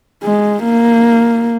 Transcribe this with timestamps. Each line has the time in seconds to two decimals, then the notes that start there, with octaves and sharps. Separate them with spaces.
0.23 G#3
0.64 A#3